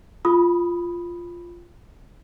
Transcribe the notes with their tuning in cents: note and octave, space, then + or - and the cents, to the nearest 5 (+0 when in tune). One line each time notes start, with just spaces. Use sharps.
F4 -5 B5 +0 D#6 +0